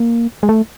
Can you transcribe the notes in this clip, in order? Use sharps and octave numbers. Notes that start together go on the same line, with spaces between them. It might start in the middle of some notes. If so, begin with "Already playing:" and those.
Already playing: A#3
G#3
A3